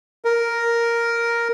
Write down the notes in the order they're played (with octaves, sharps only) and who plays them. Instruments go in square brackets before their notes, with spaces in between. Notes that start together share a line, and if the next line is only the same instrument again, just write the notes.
[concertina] A#4